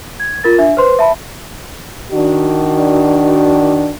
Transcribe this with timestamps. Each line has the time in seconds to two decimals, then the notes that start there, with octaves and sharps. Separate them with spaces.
0.20 G#6
0.44 F4 A#4 A6
0.59 D4 E5
0.77 B4 C5 C6
0.99 E5 A5 B5
2.12 D#3 D4 F#4